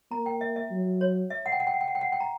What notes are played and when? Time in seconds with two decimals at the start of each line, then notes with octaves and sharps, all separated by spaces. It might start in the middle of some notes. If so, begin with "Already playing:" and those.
0.11 A#3 A#5
0.26 G5
0.41 E5
0.56 E5
0.71 F#3
1.01 C#5
1.30 E5
1.46 F#5
1.52 G5
1.60 F#5
1.67 G5
1.74 F#5
1.81 G5
1.88 F#5
1.95 G5
2.01 F#5
2.12 G5
2.20 A#5